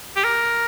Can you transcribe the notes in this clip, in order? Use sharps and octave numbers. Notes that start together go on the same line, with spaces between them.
G4
A#4